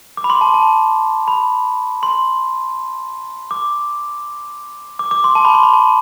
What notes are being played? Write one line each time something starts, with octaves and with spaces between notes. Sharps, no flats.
D6
B5
C6
A5
A5
B5
C6
D6
D6
D6
C6
A5
B5
C6
B5
A5